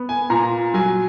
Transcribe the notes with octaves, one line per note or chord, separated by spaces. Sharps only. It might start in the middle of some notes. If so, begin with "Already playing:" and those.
Already playing: B3
G#5
A#2 A#5
F#3 G#5